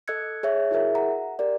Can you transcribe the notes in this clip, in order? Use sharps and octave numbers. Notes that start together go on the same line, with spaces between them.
A4 D#5 E6 F#6 G#6 C#7
G#4 C#5 E5
E4 F#4 G#4 A#4 E5
F#5 A#5
G4 A#4 D5